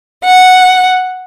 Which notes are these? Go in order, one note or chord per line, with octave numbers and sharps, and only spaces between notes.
F#5